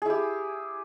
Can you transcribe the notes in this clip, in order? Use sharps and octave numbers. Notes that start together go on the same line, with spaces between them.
E4 G4 G#4